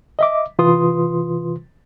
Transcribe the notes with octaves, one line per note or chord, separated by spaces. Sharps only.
D#5 E5 D6
C3 E3 F4 B4 C6 D#6